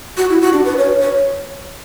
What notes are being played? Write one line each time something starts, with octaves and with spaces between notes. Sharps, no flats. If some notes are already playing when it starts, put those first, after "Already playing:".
F#4
E4
F#4
D4
B4
C#5
C#5